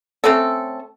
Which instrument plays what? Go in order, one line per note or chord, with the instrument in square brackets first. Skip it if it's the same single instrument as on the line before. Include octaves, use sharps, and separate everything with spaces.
[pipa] A3 C4 C#4 A4